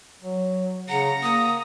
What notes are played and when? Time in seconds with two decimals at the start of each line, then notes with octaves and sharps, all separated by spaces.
0.22 F#3
0.89 C#3 F#5 A#5
1.23 A#3 D#6